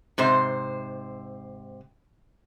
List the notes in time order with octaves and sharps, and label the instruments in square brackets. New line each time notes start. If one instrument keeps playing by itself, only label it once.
[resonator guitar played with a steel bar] G#2 C3 C5